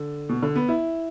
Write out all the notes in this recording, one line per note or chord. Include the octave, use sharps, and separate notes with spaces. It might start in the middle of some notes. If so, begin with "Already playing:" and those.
Already playing: D3
B2
D3
B3
E4